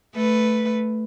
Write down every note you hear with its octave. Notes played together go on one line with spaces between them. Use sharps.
A3 B4